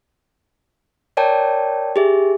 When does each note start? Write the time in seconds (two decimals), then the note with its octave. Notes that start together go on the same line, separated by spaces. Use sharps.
1.17 A#4 C#5 D5 G5 A5
1.96 G4 G#4 E5